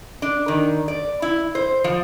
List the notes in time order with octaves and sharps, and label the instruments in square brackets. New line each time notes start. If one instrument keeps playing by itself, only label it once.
[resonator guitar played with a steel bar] D4
D#3
D5
E4
C5
F3